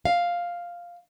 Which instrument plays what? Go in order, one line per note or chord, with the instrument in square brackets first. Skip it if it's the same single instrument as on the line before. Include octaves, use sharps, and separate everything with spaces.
[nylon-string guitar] F5